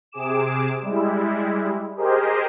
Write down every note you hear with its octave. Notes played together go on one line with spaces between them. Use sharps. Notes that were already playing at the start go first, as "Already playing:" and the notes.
C3 G#4 D6 E7
G3 G#3 E4
G4 G#4 A#4 C5 D#5